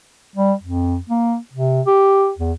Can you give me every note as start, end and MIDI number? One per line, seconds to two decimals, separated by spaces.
0.36 0.53 55
0.63 0.97 41
1.09 1.37 58
1.53 1.81 48
1.87 2.31 67
2.39 2.53 40